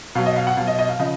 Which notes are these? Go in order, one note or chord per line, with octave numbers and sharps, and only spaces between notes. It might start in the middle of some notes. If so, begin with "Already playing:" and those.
B2 F#3 F5
D#5
F5
F#5
B2 F#3 F5
D#5
D#5
F5
C#3 F3 D#5